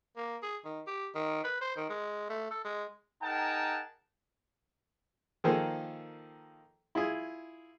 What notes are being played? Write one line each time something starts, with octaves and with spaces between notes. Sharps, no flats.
A#3
G#4
D#3
G4
D#3
B4
C5
D#3
G#3
A3
A4
G#3
D#4 G#4 A#4 F#5 G5 A5
D#3 F3 A#3 G#4 A4 C5
E4 F4 G#4